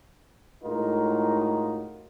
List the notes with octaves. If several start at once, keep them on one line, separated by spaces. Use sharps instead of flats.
A2 G#3 D#4 F4 F#4 A#4